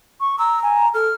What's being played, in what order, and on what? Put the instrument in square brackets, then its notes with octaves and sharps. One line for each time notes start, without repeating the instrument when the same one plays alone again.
[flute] C#6
[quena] A#5 [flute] E6
[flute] G#5
[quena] A4 [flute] F6